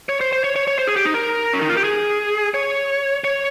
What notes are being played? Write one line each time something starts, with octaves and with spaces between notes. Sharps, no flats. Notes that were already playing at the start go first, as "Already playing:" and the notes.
C#5
C5
C5
C#5
C#5
C#5
C5
G#4
G4
D#4
A#4
C#4
D#4
F4
G4
G#4
C#5
C#5